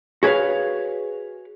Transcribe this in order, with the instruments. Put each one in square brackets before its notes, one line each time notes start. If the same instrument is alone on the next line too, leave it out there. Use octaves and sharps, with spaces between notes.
[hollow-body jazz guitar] F#4 G#4 B4 C#5 F5